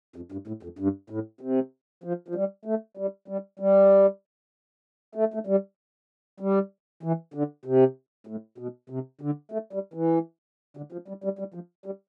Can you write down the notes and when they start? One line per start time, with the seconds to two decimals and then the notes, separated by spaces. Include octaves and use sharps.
0.16 F2
0.32 G2
0.47 A2
0.63 F2
0.79 G2
1.10 A2
1.41 C3
2.04 F3
2.28 F3
2.35 G3
2.65 A3
2.97 G3
3.28 G3
3.60 G3
5.15 A3
5.34 A3
5.47 G3
6.40 G3
7.03 E3
7.34 D3
7.65 C3
8.27 A2
8.58 B2
8.90 C3
9.21 D3
9.52 A3
9.73 G3
9.94 E3
10.77 D3
10.92 F3
11.08 G3
11.24 G3
11.39 G3
11.54 F3
11.86 G3